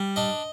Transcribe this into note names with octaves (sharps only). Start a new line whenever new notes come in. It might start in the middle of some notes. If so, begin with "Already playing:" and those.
Already playing: G3
D4 D#5